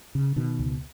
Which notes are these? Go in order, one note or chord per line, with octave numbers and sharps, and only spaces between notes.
C#3
B2 D#3
C#2